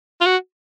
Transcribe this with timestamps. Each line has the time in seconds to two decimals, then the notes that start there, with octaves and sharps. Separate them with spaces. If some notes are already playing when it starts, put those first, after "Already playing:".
0.21 F4
0.26 F#4